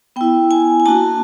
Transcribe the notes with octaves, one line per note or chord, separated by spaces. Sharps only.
B3 E4 G5
G#5
G#5
A#3 D4 F#4 A5